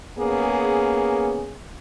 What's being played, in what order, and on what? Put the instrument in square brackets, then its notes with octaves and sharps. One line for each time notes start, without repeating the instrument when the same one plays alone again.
[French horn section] A#3 B3 C#4 G#4